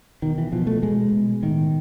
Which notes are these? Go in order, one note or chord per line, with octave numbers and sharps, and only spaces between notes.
B2 D#3
E3
B2 F3
A3
B2 G#3
B2
A2 D#3